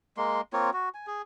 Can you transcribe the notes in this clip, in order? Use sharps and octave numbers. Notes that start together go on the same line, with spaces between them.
G#3 A#3 C6
A#3 C4 F4 C#5
F#4
G#5
G#4